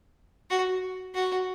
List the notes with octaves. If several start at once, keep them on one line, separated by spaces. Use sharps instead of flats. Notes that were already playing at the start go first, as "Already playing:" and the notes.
F#4
F#4